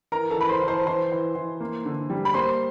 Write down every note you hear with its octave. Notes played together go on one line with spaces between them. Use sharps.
E3 A#4 A#5
A4 A5
E3 B5
C5 C6
E3
C5 C6
E3 C5 C6
E3
E3
A#3
D3
G3
B5
A#3 C5 C6